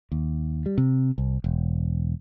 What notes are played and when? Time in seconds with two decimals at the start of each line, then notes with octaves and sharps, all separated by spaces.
0.12 D#2
0.66 G3
0.78 C3
1.18 C2
1.44 E1